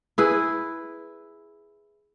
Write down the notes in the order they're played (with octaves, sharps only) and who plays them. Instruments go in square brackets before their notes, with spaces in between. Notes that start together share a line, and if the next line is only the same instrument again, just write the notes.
[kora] E4 G#4 B4